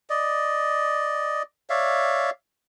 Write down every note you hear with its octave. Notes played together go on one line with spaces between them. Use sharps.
D5 D#5
C#5 D5 E5 F5